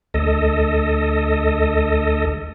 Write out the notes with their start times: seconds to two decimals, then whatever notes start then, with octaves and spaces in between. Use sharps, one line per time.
0.14 D2 A4 D#5